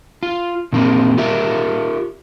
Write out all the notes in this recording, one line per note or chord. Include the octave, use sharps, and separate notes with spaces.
F4
A#2 D#3 A#3 C4
F4 G4 A#4 E5